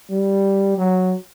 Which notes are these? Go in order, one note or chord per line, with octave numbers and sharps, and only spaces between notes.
G3
F#3